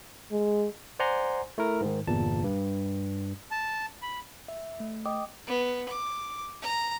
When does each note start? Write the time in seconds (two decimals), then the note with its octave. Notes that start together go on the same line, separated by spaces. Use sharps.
0.32 G#3
0.99 C5 D5 F#5 G#5 A#5 C6
1.58 A3 E4 A#4
1.81 G#2 D#3
2.07 G1 E2 A#2 A5
2.44 G2
3.51 A5
4.02 B5
4.48 E5
4.80 A3
5.06 D#5 G5 D6 D#6
5.46 B3
5.88 D6
6.62 A#5